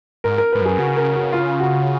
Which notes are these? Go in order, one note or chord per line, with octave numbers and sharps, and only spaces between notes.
G#2 A#4
A#4
G#2 B4
F#2 G#4
C#3 F#4
A#4
F#4
F4
F#4